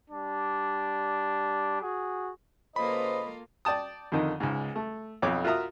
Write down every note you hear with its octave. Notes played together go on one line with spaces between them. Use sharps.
G3 D4
F#4 G#4
C#3 A#3 F4 A4 B4 C5 D#5 B5
D5 G5 A5 D#6
F2 D3 D#3 D#4
C#2 G#2
A3
B1 F2 C#5 D6
F4 F#4 A#4 E5 A#5 D#6